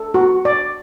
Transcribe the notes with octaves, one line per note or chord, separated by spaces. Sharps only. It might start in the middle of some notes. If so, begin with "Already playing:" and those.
Already playing: A4
F#4
D5